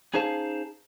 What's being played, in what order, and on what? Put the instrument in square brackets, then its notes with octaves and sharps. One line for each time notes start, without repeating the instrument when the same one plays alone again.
[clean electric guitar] C#4 D#4 G#4 C5 F5 A5